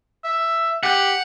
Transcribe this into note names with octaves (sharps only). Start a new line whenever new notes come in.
E5
G4 F#5